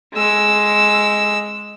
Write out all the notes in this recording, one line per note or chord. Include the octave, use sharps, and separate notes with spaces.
G#3 E6